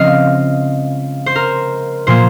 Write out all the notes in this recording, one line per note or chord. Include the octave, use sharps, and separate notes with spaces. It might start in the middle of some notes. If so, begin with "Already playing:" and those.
Already playing: C#3 F3 G#3 C4 D#5 F5
C5
A#4
A#2 F3 A#3 C5